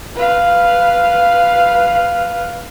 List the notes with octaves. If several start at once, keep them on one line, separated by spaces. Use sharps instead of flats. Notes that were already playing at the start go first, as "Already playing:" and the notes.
B4 F5